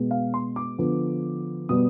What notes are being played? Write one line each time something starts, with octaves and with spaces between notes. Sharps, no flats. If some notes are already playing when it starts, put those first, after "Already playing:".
Already playing: B2 G#3 B3
F5
C6
D6
D3 F3 B3
B2 G3 B3 D#6